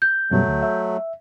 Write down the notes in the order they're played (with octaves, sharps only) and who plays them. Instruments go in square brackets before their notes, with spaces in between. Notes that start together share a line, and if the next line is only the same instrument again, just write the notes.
[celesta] G6
[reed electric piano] F#2 B2 G3 [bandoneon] F#3 A3
[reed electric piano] D2
E5